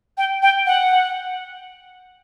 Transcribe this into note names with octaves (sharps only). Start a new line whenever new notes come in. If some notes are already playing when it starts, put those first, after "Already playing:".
G5
G5
F#5